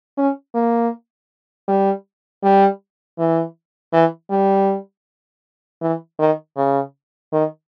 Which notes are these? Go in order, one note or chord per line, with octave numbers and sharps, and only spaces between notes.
C#4
A#3
G3
G3
E3
E3
G3
E3
D#3
C#3
D#3